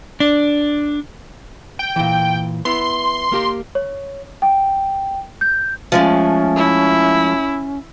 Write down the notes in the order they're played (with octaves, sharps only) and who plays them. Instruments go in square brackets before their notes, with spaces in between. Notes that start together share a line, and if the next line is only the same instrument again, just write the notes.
[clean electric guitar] D4
[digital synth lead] G5
[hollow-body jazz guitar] A#2 E3
[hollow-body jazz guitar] B3 E4 [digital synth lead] C6
[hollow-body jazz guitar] A#3 G4 A#4
[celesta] C#5
G5
G6
[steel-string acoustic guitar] F3 G#3 A3 [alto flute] C#4
[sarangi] E4